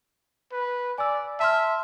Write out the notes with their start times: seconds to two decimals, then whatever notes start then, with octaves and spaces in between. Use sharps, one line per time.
0.52 B4
0.98 D5 G#5 E6
1.40 E5 A5 C6 F6